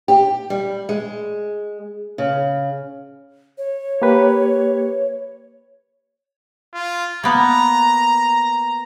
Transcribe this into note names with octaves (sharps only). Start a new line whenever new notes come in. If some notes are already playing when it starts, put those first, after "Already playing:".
G4
G3
G#3
C#3
C#5
A#3 G4 B4
F4
A#3 B3 A#5